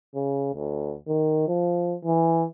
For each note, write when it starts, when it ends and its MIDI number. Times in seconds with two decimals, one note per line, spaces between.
0.15 0.51 49
0.55 0.95 38
1.08 1.44 51
1.48 1.96 53
2.05 2.46 52